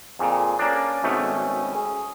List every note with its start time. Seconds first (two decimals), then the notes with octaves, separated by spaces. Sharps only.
0.19 F2 A#2 G#4
0.59 A#3 C#4 D4
1.04 G#1 B2 A3
1.74 G#4